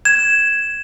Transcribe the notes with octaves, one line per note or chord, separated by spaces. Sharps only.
G#6 E7